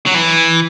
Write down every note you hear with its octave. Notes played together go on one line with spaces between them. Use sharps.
F#3
E3